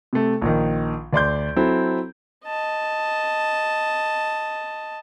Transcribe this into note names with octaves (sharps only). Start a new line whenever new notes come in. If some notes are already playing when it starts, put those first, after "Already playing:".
C3 A3
A#1 D#3
D2 D5 C6 G6
F#3 C4 E4 A4
D#5 A5